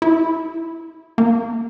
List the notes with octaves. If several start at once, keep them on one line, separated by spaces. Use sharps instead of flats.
E4
A#3